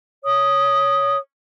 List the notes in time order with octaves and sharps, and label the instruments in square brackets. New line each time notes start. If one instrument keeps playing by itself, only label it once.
[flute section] C#5 D#6